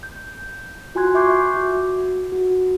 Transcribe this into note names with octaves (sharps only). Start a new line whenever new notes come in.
G6
F4 F#4 G#5 C6 F#6 G#6
E5 C#6 D6 G6 C7
F#4
F#4